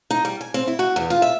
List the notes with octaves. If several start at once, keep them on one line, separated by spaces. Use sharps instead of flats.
D#4
G3
G#5
C4
E4
F#4
E2
F4
E5